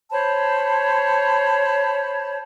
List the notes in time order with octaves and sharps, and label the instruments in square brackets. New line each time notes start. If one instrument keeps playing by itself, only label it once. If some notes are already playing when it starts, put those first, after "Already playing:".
[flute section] C5 C#5 A5 B5